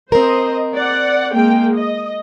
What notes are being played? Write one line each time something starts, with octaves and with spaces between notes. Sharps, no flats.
C4 A#4 C5 D#5
D5 F#5
G#3 A#3 G5
D#5